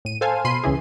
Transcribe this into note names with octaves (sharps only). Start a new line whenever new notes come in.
A2 D#7
A4 C5 F5 G#5 A5
B2 B5 C6 C7 D#7
C#2 C#3 E3 G#4